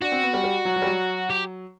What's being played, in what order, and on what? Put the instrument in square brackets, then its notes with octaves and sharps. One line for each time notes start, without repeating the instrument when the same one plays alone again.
[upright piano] D4 [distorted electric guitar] F#4
[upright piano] C4
B3
G3
G3
F#3
F#3
G3
F#3
[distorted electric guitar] G4